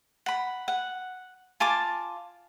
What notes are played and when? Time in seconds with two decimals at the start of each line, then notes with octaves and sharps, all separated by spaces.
0.26 F#5 B5
0.68 F#5
1.60 F4 G#5 A5 D6